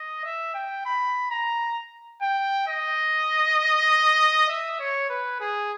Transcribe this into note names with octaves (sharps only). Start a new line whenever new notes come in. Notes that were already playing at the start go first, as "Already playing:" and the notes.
Already playing: D#5
E5
G5
B5
A#5
G5
D#5
E5
C#5
B4
G#4